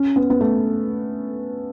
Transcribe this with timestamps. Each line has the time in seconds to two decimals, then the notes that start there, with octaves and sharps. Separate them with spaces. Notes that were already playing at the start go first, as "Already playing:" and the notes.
Already playing: C#4
0.16 B3
0.30 B3
0.41 A3